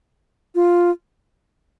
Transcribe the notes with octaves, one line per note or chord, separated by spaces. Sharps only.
F4